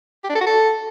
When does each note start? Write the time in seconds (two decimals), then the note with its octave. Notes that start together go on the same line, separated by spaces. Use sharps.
0.24 G4
0.29 D4
0.35 A4
0.41 F#4
0.46 A4